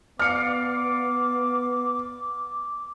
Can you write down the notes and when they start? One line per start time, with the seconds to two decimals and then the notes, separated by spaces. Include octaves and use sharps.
0.19 B3 D5 F5 D6 F6 C#7